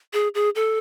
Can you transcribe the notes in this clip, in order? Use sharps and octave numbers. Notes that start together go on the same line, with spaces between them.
G#4
G#4
A4